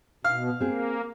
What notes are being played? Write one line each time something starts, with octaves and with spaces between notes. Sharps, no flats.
B2 F5 F6
A#3 C4 G#4